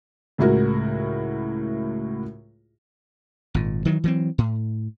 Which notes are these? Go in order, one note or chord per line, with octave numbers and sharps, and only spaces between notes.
C#2 A2 E4 F#4 A#4
G#1 A#2
D#3 E3 F#3
E3 F#3 C4
A2